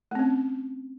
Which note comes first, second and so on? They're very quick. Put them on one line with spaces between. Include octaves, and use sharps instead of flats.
A3 C4 C#4